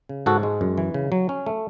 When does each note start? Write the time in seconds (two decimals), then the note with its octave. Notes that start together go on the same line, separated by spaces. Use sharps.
0.09 C#3
0.26 G#2 F#4 A4
0.43 G#3
0.61 F#2
0.78 E3
0.94 C#3
1.12 F#3
1.29 C#4
1.46 A3